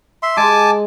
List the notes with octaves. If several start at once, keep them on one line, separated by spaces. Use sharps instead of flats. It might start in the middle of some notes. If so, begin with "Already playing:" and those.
E5 C6
G#3 G#5 A5 D6